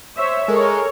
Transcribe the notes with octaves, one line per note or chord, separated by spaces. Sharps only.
C5 C#5 E5
G#3 A4 A#4 C#5